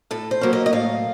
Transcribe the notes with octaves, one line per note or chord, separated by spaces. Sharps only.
A2 A4
C5
F#3 A#3 C#4
D#5
D#5
A2 F5